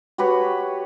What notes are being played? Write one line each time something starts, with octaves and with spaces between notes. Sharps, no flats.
F#4 G4 B4 C#5